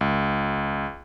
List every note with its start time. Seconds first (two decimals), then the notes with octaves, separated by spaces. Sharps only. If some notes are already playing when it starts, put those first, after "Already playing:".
0.01 C#2